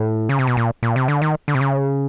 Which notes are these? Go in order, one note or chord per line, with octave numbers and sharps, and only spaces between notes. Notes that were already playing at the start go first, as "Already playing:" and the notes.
Already playing: A2
C#3
C3
B2
A#2
A#2
C3
D3
D#3
D3
C3
C#3